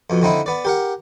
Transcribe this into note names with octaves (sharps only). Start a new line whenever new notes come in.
F2 B2
D3 C4 D#4 E4
B3 D5
G4 A#4 F#5